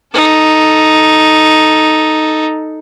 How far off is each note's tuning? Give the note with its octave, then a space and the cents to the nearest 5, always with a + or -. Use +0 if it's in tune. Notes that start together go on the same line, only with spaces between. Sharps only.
D#4 +0 A4 +0